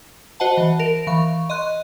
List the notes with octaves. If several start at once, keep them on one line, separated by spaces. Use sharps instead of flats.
F#4 C5 D#5 F#5 A5
E3
A#4 D7
E3 F5 C#6
D#5 C6 F#6